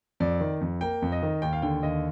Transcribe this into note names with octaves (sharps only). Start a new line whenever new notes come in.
F2 D5
D#3
F2
A#3 G5
F2
D#5
D#3
D#2 G5
F5
D3 G5
D#2 D#5